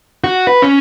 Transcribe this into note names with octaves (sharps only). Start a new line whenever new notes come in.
F#4
B4
C#4